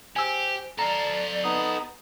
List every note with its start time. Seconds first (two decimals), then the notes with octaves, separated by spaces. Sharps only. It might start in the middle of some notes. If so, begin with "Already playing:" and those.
0.16 G4 C5 G#5 E6
0.79 A4 D5 F5 A#5
1.44 B3 D#4 D#6